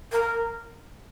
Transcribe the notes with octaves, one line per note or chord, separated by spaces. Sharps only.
A#4